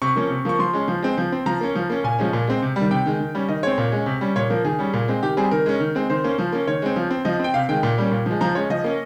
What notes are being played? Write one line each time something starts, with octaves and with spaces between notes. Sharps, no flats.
C3 C#6
F3 A#3 C#4
C3
F3 A#3 C#6
F3 C6
G#3 C#4
F3
G#3 C4
F3
C4
F3 A#5
A#3 C#4
F3
A#3 C#4
A#2 G#5
F3 G#3 C#4
A#2
G#3 C4
C3
G3
D#3
C3 G5
D#3 G#3
D#3
G3 C#4
D#3 D#5
G#3 C4 C#5
A#2
G#3 C#4
C3
G3 C#4
A#2 C#5
F3 A#3 A#4
D#3 G#4
G3 C#4
A#2
G#3 C4
D#3 G4
G3 C4 G#4
D#3 A#4
G#3 C#4
D#3
G#3 C4
D#3 C5
A#3 C#4
F3
A#3 C#4
D#3 C#5
G#3 C4
F3
C4
F3 D#5
C4
G5
C3 F5
D#3 G#3 G5
A#2
G3 A#3 C#4
A#2
F3 G#3
F3 A#5
G#3 C#4 C#5
F3 D#5
A#3 C#4